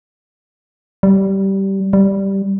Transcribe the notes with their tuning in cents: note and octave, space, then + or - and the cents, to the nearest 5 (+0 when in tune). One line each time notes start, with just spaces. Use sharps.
G3 -15
G3 -5